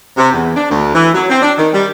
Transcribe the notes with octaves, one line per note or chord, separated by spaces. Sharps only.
C3
E2
D4
D2
E3
F#3
C4
D4
D#3
G3